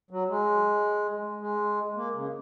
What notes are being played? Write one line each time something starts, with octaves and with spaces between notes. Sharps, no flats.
F#3
G#3
G#3
A#3
C#3